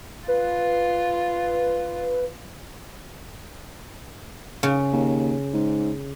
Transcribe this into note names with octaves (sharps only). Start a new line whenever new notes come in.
F4 B4
C#3
D#2
G#2